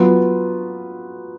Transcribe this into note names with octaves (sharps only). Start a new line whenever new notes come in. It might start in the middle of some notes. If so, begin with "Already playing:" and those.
Already playing: F#3 B3 F4 B4